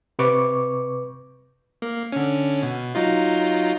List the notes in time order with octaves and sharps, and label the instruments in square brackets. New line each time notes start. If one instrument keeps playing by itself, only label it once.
[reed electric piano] C3 B4 C#6 D6
[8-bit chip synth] A#3
D3 C#4
B2
F#3 D#4 F4